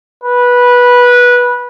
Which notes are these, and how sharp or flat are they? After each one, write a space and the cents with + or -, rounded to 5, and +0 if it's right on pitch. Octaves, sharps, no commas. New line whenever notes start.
B4 -15